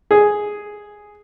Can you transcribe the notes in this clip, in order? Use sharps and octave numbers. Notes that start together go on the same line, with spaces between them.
G#4